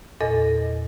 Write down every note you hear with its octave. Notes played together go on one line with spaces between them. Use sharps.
E2 A#2 A4 D#5 A#6